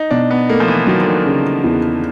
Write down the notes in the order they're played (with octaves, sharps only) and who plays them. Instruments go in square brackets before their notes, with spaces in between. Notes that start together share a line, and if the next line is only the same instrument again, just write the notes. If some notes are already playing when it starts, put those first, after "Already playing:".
Already playing: [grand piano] D#4
[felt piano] B2 [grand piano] D4
[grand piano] B3
[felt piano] A3 [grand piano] A#3
[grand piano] F3
E3
[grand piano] D#3 [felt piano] F#3
[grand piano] D3
D#3
[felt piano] C#3
E2